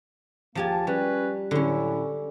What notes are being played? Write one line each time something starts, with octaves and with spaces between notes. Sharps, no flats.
D#2 F3 A#3 G4 G#5 A5
G3 C#4 B4
A2 D3 F#3 C#4 E4